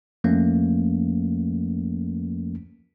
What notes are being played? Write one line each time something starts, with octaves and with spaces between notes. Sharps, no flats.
F2 F3 A3 A#3 C#4